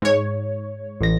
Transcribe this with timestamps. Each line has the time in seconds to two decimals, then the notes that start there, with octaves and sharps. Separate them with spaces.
0.02 G#2 C#5
1.01 A1 A#6